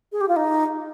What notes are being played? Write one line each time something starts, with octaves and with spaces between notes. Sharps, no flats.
G#4
G4
F4
D#4